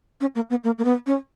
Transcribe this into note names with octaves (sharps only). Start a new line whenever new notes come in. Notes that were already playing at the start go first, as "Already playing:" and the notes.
C#4
A#3
B3
A#3
A#3
B3
C#4